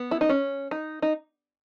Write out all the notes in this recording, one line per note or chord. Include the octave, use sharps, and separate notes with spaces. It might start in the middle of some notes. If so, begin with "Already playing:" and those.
Already playing: B3
E4
D#4
C#4
D#4
D#4